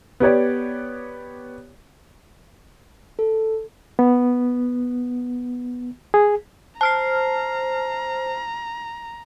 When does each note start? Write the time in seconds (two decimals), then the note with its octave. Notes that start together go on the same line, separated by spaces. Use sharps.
0.20 B3 G4 C#5 D5
3.19 A4
3.99 B3
6.14 G#4
6.81 C5 A5 A#5 F6 C7